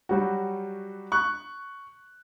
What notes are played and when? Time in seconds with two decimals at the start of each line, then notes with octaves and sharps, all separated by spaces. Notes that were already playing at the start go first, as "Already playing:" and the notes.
0.09 F#3 G3 F#4
1.12 C#6 F#6